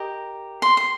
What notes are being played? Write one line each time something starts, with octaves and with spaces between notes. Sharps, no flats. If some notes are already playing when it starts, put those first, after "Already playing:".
Already playing: G4 A#4 D#5
C6
C6